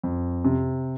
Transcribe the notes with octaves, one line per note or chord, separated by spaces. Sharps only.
F2
C3